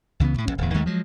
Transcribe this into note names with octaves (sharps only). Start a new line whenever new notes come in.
C#2 C#3 E3 B3
A2 C#3
A#1 G#2 C#4
D1 E2
D#2 D#3 G#3 A3
F3 F#3 G#3